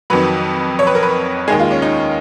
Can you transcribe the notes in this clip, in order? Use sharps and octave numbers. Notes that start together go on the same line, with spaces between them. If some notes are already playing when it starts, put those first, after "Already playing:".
F2 D#3 F#3 B4
C#5
B4
A#4
B4
D#2 D#3 G#3 G#4
F4
C#4
D#4